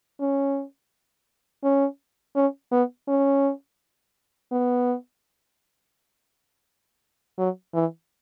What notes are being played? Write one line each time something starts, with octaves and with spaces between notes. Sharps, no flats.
C#4
C#4
C#4
B3
C#4
B3
F#3
E3